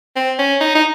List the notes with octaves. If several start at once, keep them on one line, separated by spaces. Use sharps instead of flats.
C4
C#4
D#4
D#4